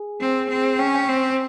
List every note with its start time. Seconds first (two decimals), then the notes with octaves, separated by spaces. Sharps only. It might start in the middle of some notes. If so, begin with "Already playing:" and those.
Already playing: G#4
0.20 C4
0.49 C4
0.79 C#4 G5
0.87 G#5
0.95 G5
1.09 C4